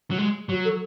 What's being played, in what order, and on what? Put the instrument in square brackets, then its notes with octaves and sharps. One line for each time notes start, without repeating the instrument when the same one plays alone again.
[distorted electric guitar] F#3
G#3
[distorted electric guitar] F#3 [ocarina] F#4
[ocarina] A4